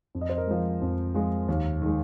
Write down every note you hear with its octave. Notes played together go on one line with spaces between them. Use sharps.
F2
D#5
C5
A#4 D#5
F3 G#3
F2
F3 G#3
D#2
D#3 G#3